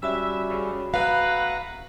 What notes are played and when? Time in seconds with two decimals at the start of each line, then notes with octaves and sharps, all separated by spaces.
0.03 G3 C#4 F#4 E5 B5
0.49 C#3
0.94 B2 A3 B4 F5 F#5 A#5